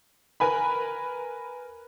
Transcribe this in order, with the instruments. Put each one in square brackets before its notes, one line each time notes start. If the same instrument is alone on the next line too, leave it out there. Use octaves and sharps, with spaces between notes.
[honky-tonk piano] A#4 B4 G#5 B5